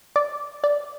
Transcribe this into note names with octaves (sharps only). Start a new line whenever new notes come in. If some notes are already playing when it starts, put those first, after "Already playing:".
D5
D5